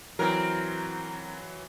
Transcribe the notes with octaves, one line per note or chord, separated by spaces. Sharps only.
E3 F#3 C4 A#4